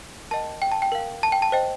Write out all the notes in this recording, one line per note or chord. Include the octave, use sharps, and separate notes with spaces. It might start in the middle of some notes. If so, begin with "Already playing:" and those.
A#4 D#5 G5 A5
G5
A5
G5
A#4 F5
A5
G5
A5
C5 D#5 G5